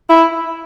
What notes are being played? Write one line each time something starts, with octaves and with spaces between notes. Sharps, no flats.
E4